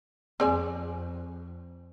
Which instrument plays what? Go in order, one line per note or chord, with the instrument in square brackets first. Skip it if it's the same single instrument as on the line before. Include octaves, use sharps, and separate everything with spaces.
[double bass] F2 [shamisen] C4 D5 G#5 [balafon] G#4